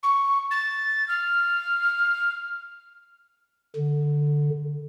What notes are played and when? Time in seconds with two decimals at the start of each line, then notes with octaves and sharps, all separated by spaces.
0.03 C#6
0.50 A6
1.08 F6
3.76 D3